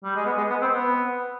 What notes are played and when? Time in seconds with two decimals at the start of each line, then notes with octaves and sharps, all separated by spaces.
0.04 G3
0.16 G#3
0.26 B3
0.37 G#3
0.50 B3
0.62 C4
0.74 B3